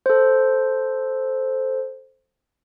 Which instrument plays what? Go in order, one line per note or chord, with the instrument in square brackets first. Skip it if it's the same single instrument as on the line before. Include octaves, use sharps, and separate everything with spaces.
[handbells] A4 C5